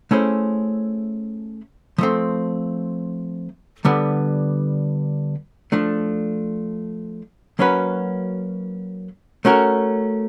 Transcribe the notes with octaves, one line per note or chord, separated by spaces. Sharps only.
A3 C#4 E4 G#4 C5
F3 A3 C4
D3 G3 B3
F3 A3 D4
F#3 A#3 C#4 F#4 B4
A3 C#4 F#4 A#4